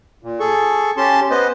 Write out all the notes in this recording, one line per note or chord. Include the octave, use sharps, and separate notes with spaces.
A#2
G#4 A4 C#6
C#4 G4 A5 C6
B3 B4 C5 D#5